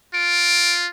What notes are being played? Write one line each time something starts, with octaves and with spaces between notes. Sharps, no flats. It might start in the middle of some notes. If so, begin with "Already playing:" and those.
F4 D7